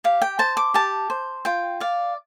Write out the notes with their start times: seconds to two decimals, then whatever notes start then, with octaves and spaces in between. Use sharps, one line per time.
0.04 G4 F5
0.22 G5
0.39 C5 A5
0.57 D6
0.74 G4 A5
1.10 C5
1.45 F4 G5
1.80 D5 F5